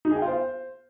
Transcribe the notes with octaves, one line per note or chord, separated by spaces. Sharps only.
D#4
G#4
G5
F4
C5